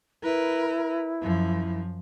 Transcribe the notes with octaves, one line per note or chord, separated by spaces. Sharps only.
E4 A#4 B4
F#2 F3